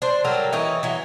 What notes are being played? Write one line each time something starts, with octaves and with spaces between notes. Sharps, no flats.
D4 C5
F#3 G3 A4 A#4
E3 C#4 D#4
E3 F#3